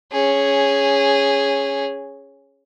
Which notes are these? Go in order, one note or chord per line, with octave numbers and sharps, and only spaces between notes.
C#4 G#4